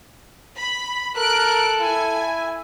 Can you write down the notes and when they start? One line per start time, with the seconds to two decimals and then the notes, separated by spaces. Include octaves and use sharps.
0.57 B5
1.17 A4 A#4 F#6 D7
1.81 E4 G#5